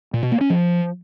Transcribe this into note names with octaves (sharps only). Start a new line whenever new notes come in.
A#2
B2
A#3
C#4
F3